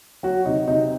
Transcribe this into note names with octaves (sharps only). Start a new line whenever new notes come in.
F#3 F#4
C3 D#4
C3 D#4